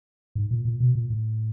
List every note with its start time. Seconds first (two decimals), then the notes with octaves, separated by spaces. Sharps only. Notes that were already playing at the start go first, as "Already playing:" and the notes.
0.35 G#2
0.51 A#2
0.65 A#2
0.80 B2
0.95 A#2
1.10 A2